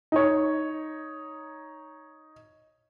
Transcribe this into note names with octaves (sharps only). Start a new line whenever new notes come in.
D#4 C#5